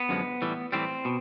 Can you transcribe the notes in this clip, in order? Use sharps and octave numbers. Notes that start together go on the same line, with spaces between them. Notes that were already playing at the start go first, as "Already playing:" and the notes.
Already playing: B3
F#2 D3 F3 G#3
A2 E3 G3
A2 E3 G3 C4
B2